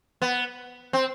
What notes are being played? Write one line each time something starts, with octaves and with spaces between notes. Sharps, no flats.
B3
C4